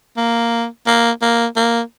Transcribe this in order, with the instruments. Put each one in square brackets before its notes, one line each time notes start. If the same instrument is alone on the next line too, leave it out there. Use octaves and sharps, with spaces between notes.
[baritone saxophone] A#3
A#3
A#3
A#3